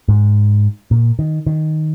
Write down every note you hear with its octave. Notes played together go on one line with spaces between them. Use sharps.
G#2
A#2
D#3
D#3